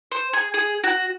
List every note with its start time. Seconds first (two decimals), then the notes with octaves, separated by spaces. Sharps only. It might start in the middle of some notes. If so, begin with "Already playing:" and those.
0.12 C5
0.33 G#4
0.54 G#4
0.84 F#4